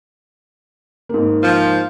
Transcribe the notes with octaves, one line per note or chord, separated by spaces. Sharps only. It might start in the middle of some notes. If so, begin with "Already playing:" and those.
G#2 A#3
F3